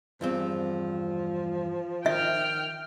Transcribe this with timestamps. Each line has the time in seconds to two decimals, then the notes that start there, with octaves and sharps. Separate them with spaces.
0.21 E2 G2 F3 C4
2.06 D#3 E5 G5 F6